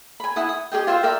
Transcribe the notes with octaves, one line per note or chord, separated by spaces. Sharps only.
G#5 B5
E4 F#5 G#5 D#6
D#6
G4 G#4 D#5 G5
F4 C5 E5 G5
A#4 D5 E5 G5